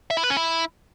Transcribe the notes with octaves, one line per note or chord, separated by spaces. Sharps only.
E5
E4
B4
C#4
E4